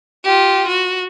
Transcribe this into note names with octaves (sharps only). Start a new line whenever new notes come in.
F4 G4
F#4